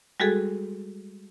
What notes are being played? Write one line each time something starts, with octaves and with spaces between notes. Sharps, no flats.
G3 G#3 F#4 G#4 A4